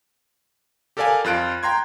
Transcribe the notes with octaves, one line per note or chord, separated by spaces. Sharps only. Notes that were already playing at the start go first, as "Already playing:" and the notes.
G4 A4 A#4 D5 F5 G#5
F2 F4 F#6 D7
G5 A#5 C6 G#6